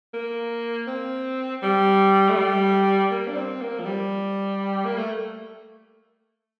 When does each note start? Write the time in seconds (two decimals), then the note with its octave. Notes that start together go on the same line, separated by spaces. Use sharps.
0.14 A#3
0.87 C4
1.63 G3
2.29 A3
2.37 G3
3.11 A#3
3.27 D4
3.36 C4
3.62 A#3
3.80 F3
3.86 G3
4.85 A#3
4.98 A3